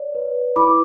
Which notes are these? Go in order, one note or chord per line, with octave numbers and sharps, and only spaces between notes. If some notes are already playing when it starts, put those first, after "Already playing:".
Already playing: C#5 D5
B4
E4 B5 D6